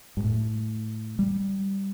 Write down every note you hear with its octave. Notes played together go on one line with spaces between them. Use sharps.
G2
A2
G3